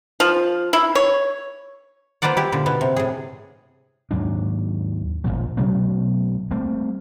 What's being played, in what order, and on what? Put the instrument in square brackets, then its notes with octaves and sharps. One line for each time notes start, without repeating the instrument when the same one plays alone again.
[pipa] F3
E4
C#5
[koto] A#3 F4 B4 C5 D5 F#5
E4 G4
A#2 D3
B2 B3
C3
A2 G#4
[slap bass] D#2 G#2 F#3 D4
D#1 E2 A#2 F3
B2 F#3 A3 A#3
G3 A3 A#3 C4